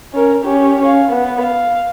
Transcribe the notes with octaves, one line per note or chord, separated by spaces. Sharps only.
C#4 A#4
C#4 G4
C#4 F5
B3
F5